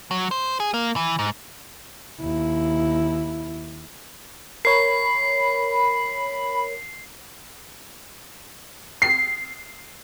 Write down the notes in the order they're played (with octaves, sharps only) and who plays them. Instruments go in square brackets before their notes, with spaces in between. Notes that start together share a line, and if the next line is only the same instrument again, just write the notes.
[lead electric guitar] F#3
C5
G#4
A#3
E3
G#2
[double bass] D#2 E4
[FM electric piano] A#4 C#5 [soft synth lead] B5 [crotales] C7
[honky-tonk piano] C7